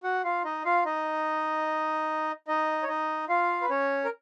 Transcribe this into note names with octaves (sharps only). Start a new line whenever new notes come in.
F#4 F#5
F4 F5
D#4 D#5
F4 F5
D#4 D#5
D#4 D#5
C#5
D#4 D#5
F4 F5
B4
C#4 C#5
A#4